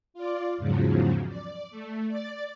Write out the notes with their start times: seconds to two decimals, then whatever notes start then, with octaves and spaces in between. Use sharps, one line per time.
0.14 F4 D5
0.58 E2 G#2 C#3 F3 F#3
1.28 D5
1.71 A3
2.08 D5 A6